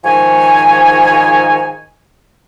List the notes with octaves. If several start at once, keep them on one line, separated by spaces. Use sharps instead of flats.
G#2 D#3 F3 C#5 G#5